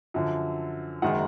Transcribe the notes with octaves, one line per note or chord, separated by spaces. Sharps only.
F#2 D3 F3
F#1 F#2 D#3 G#3 F#5